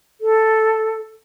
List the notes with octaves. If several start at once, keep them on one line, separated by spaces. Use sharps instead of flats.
A4